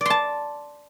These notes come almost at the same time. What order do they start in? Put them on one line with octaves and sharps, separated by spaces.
D5 C6 A5